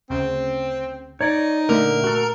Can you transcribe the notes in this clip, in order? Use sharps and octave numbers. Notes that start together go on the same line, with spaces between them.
D2 C#3 C4
D#4 C#5 D5
A#2 D3 A3 A#4 A#5
F#4 A4